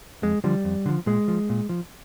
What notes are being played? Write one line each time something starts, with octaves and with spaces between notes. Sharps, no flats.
F2 G#3
D3 F3 G3
F2
D3 F3
A#2 G#3
F3
A#2
F3